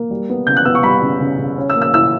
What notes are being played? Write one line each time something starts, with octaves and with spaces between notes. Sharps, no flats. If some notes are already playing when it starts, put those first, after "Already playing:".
Already playing: A#3
G3
B3
C#3 G6
F#6
B3 E6
C#6
G3 B5
C#3
C#3
C#3
C#4
E6
A#3
E6
E4 E6